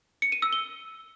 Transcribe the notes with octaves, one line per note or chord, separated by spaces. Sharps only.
C#7
D#7
E6
G7